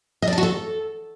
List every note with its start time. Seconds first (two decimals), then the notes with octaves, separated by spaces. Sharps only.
0.22 D#5
0.28 D5
0.33 A5
0.38 F#4
0.43 A4